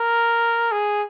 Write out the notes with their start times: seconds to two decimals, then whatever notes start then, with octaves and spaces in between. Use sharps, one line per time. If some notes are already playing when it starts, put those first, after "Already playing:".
Already playing: A#4
0.72 G#4